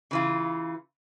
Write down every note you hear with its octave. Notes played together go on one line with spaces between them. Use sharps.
C#3 E3 F4